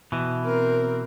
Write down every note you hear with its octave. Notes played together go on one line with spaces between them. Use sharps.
B2 E3
C4 A#4